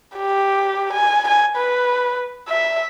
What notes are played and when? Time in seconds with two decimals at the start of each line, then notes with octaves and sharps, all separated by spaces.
0.17 G4
0.93 G#5
1.28 G#5
1.57 B4
2.49 E5